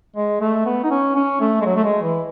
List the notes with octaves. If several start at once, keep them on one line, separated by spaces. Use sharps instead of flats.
G#3
A3
B3
D#4
C#4
C#4
A3
G#3
F#3
A3
G#3
E3